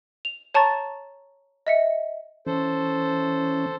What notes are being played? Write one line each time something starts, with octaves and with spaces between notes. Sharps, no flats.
F7
C#5 A5 A#5 C#6 A6
D#5 E5 C#7
E3 C#4 A4 C5